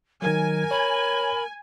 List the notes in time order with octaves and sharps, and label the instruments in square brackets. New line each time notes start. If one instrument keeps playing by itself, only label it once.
[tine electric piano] D#3 F#3 [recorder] A#4 [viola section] G#5
[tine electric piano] C#5 [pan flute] B5